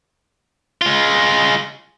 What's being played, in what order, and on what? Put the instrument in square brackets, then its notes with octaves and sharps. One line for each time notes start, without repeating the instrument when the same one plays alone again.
[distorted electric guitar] G#3 F4